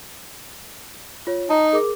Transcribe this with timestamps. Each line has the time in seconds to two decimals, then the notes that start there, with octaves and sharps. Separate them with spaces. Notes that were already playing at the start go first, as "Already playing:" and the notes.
1.27 F4 C#5
1.49 D#4 A5 A#5
1.73 G#4 A#4 D6